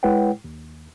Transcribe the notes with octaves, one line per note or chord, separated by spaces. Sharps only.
G#3 E4 B4 C#5 F#5 G5
D#2